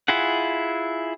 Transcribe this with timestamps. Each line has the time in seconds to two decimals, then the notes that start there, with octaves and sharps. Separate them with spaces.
0.08 E4 F4 G#4 F#5